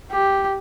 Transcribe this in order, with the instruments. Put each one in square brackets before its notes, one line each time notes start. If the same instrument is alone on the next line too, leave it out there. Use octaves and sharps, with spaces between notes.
[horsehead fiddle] G4